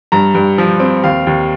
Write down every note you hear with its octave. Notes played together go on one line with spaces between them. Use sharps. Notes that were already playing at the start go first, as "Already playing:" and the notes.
G2 A#5
G2
F3
C4
D#2 F5
D#2